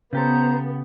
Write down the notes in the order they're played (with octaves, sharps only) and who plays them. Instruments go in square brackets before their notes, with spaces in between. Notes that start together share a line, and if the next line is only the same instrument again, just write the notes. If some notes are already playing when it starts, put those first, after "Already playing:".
[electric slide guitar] C#3 G4 A4 [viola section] B3 [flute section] C5 A#5